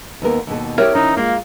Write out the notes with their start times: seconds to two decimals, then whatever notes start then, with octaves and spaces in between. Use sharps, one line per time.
0.22 D#2 B3 A#4
0.47 D#2 B2 A4
0.78 C4 E4 G4 A#4 C#5 E5
0.95 E3 C#4 D#4 E4
1.17 G#3 A#3 F4